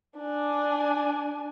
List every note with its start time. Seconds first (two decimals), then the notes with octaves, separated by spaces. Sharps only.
0.18 D4 G#5